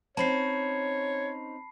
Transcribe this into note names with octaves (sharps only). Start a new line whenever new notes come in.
C4 C#4 D#4 C#5 A5 B5 C7